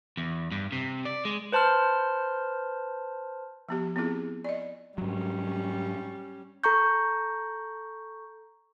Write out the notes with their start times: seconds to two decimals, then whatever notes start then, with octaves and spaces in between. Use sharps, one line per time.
0.17 E2
0.52 G2
0.72 C3
1.05 D5
1.25 G#3
1.52 B4 C5 A5 C6 F6
3.69 F3 B3 G4
3.96 B3 C4 E4 F4 G#4
4.44 D5 D#5
4.98 G#2 F#3 G3 C#4
6.64 A4 A#5 C#6 G6